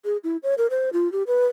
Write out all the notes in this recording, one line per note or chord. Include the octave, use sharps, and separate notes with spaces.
G#4
E4
C#5
A#4
C5
F4
G4
B4